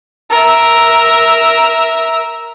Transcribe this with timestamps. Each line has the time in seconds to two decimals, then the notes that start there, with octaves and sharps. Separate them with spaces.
0.30 A#4 E5